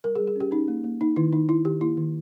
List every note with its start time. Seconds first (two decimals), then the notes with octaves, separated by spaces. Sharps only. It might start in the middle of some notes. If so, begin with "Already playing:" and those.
0.04 G3 A#4
0.15 G#4
0.20 G3
0.27 G#4
0.36 C#4 G4
0.51 C#4 D#4
0.68 A#3
0.84 A#3
1.00 A#3 D#4
1.16 D#3 E4
1.32 D#3 D#4
1.49 D#3 E4
1.65 D#3 G4
1.80 A#3 E4
1.97 D#3